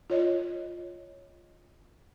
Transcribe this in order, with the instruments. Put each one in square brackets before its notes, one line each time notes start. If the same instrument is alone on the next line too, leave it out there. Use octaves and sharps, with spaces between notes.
[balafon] F4 C#5 D#5